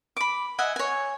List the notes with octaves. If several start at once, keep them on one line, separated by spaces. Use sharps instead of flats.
B5 D6
D#5 E5 F#5 G#5
C#5 G#5